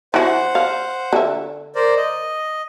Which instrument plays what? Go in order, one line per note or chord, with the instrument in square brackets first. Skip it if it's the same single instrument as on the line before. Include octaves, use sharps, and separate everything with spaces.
[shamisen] E3 F#4 [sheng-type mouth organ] C5 F#5
[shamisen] F5
D3 E5
[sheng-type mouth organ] A#4 C5 D5
D#5